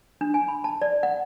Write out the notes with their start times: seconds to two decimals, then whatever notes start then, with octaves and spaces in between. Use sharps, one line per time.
0.21 D4
0.34 G#5
0.48 B5
0.64 A5
0.81 D5
1.03 F#5